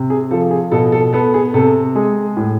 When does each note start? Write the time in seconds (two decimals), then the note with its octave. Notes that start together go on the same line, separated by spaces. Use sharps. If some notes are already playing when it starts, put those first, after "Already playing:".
Already playing: C3
0.10 G#4
0.31 F3 A4
0.51 G#4
0.72 B2 A4
0.92 A4
1.13 B3 A4
1.34 G#4
1.54 C3 A4
1.95 G#3 G#4
2.37 A2